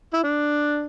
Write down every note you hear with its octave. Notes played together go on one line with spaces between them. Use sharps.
E4
D4